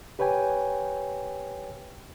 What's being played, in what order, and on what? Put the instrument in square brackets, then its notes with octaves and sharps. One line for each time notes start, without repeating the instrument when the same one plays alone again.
[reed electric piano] G4 B4 C#5 G5 G#5